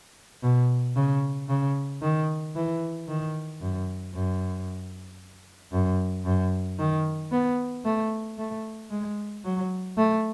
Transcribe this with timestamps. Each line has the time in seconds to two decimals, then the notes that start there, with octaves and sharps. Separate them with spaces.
0.42 B2
0.96 C#3
1.49 C#3
2.02 D#3
2.56 E3
3.08 D#3
3.61 F#2
4.14 F#2
5.72 F#2
6.25 F#2
6.79 D#3
7.32 B3
7.85 A3
8.38 A3
8.91 G#3
9.44 F#3
9.97 A3